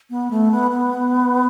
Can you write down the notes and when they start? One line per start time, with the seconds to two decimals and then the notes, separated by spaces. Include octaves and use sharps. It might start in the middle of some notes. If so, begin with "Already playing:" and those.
0.10 B3
0.31 A3
0.51 B3
0.71 B3